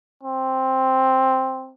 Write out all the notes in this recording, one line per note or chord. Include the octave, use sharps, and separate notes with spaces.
C4